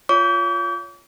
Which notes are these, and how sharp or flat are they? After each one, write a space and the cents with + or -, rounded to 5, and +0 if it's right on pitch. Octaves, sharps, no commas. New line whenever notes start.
F4 +0 C#5 +20 D6 -45